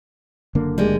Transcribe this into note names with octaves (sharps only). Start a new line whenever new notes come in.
F#1 D3 A#3
G3 G#3